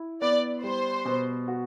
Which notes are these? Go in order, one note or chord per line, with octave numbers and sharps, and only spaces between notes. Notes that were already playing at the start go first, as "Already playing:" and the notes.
Already playing: E4
B3 D5
G3 C5
B2
F#4